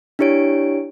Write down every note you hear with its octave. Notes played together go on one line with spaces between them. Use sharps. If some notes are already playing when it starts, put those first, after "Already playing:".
D4 E4 G4 C#5 D7